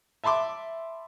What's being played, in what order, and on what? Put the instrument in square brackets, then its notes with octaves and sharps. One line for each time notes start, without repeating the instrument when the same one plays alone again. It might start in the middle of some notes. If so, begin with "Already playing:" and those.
[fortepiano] E5 A5 B5 C6 D6